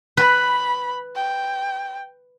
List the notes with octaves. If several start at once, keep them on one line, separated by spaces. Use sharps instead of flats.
B4 B5
G5